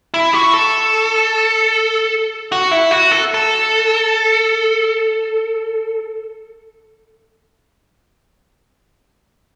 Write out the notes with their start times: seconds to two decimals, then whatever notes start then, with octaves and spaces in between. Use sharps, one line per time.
0.14 E4
0.33 F#4
0.54 A4
2.52 F#4
2.71 E4
2.91 F#4
3.11 A4
3.34 A4